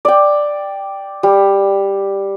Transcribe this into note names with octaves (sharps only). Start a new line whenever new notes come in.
D5 G5
G3